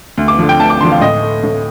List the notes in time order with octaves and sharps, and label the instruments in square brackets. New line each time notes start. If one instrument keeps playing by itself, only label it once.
[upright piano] D2
D6
D3 F3
G5
D2 A5
D6
D3 C6
F3
F5
A2 D#5
A3
A2